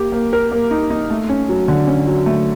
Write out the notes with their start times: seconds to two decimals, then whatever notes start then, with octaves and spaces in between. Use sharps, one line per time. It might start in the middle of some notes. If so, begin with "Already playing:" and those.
Already playing: A#3 G4
0.12 A#3
0.33 A#4
0.52 A#3
0.71 D#4
0.90 D#4
1.10 A3
1.29 C#4
1.49 F#3
1.68 D3
1.87 C#4
2.07 F#3
2.26 A3